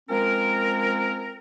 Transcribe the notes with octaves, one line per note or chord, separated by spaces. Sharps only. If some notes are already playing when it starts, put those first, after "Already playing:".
F3 G#3 C4 C#4 A#4